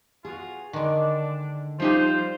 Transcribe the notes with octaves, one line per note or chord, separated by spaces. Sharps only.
B2 F4 F#4 G#4
D3 D#3 G#3 D4
F3 G3 D#4 F4 G4 C5